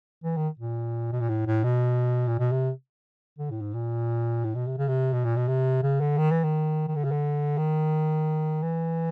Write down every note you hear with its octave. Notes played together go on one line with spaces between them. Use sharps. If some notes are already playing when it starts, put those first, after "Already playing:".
E3
D#3
A#2
B2
A#2
A2
A2
B2
A#2
B2
C3
D3
A2
G#2
A#2
A2
B2
C3
C#3
C3
B2
A#2
B2
C3
C#3
D3
D#3
E3
D#3
D#3
D3
C#3
D3
D#3
E3